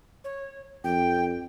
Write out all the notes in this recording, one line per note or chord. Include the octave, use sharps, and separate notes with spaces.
C#5
F2 G5